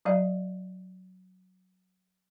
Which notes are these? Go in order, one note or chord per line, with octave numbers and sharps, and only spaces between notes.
F#3 D5 F5